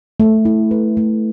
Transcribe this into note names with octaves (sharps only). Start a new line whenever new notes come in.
A3
E4
B4
A3